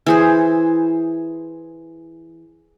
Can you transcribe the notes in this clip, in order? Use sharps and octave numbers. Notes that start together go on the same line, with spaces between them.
E3 G#4 C5